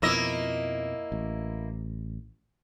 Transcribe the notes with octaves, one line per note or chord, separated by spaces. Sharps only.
F2 B2 F3 A#3 E4 D#5
A1